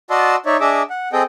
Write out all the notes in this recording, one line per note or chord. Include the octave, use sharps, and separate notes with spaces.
F#4 D5 D#5 A5 C6 E6
D#4 C#5 D5 E5
D4 G#4 D#5 E5 D6 E6
F#5
C4 G#4 A4 D#5 G5